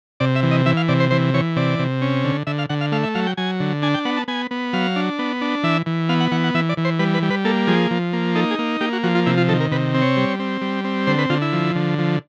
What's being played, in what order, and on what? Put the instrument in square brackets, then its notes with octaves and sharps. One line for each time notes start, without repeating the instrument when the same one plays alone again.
[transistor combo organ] C3 D5
E5
E3
D#5
E3 E5
F5
C3 D5
C5
E3 C5
E3 C#5
C3 D5
C3
C#4
D3
D3 E5
F5
D3 F#5
F5
A3 F5
E5
F#3 F5
G5
F#3 G#5
D3
D4 G#5
G5
B3 F#5
A5
B3 G#5
B3
F#3 F5
D4
B3
D4
E3 E5
E3
B3 F5
F#5
E3 F#5
F#5
E3 E5
D5
E3
C5
G3 B4
B4
G3
B4
A#3 A4
F3 G#4
F3
A#3
D#4 A4
G#4
A#3
A#3 G4
F#4
F3 F#4
F4
C3 E4
F4
D#3 A4
A#4
C3 B4
C4
C#5
G3
C4
G3
C4
D3 C5
B4
D3 F4
E4
F3
D3
F3